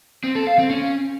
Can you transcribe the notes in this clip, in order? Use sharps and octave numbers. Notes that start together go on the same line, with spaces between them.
C4
A4
F5
C4
C#4